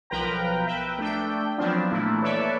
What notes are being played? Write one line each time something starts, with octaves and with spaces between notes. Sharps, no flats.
B1 F3 A#4 B4 G5 A#5
B4 E5 G5
A3 D4 G5
F3 F#3 B3 C4 D4 F4
A#2 E3 A3 A#3 E4
A4 B4 C#5 D5 E5